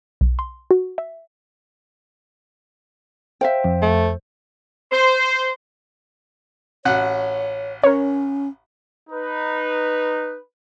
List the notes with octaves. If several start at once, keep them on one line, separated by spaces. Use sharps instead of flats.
B1
C6
F#4
E5
C5 E5 F5 G5
F2
A3
C5
A1 F#4 C#5 F#5
C#4 A#4 C#5
D#4 B4